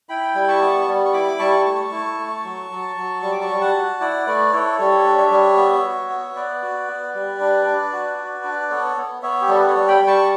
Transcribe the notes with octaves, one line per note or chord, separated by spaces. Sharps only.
E4 G5 B5
G3
A5 C#6
B3
G3
C#6
E4 B5 D6
G3 A5 C#6
A3 A5 C#6
E4
A3
F#3
F#3
F#3
G3 C#6
D6
A5 C#6
G3
F#5 A5
F#4
E4 D5 F#5
A3 B4 D5
E4 A4 C#5
G3 A4 C#5
D4
C#5 E5
G3
B3
F#4
B3
B3 B4 D5
F#4
B3
G3
D4
D4
F#4
F#4
D4
B3 A4 C#5
B3
B3 C#5 E5
G4
G3 A4
B4
A4 C#5
G3
G5 B5
G3
A5 C#6